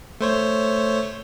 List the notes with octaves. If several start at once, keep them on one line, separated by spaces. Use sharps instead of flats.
A3 C5 C#5